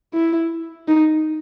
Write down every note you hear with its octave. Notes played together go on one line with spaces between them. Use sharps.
E4
D#4